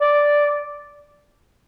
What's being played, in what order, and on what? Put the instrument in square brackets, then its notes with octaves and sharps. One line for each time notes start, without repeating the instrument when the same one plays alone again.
[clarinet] D5